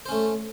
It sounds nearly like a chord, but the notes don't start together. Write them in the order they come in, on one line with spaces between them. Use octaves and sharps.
C5 C#4 A3